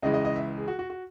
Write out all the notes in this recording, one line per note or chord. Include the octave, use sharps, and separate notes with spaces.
C#2 C#3 E3 G#3 D#5
D#5
D#5
E5
G#4
F#4
F#4
F#4